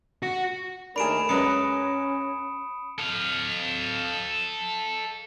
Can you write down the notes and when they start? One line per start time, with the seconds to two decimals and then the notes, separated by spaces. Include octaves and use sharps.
0.23 F#4
0.96 D#2 A3 D4 G#4 A#4 B5 D7 E7
1.29 F#2 G#3 C#4 B4 D#6 C#7
2.98 A4 F5